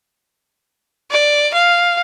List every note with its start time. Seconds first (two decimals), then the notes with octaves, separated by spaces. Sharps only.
1.11 D5
1.54 F5